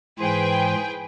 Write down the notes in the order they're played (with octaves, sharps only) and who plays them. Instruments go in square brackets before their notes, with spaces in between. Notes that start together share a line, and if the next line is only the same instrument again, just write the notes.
[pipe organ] G#2 E3 C5 [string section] G#4 B4 G5